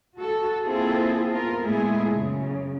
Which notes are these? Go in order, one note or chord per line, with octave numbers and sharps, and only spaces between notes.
F#4 A4
A#3 C4 E4 F4 G#4 A4
B3 F4 A#4
A#2 G#3 A3 B3 E4 G#4
F#2 C#3